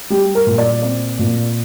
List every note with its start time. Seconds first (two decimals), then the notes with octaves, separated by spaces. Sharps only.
0.10 G3 G4
0.35 A#4
0.47 A#2
0.58 D5
0.82 C4 D5
1.19 A#2